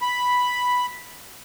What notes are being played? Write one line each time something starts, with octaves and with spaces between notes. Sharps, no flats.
B5